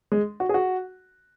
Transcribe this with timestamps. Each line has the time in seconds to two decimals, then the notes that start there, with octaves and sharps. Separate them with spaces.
0.12 G#3
0.40 F#4
0.49 G#4
0.54 F#4